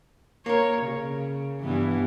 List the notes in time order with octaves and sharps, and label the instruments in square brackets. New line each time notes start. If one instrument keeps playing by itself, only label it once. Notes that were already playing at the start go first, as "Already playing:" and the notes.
[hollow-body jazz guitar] A#3 A#4 [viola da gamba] C#5
[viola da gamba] C#3
G2 E3 B3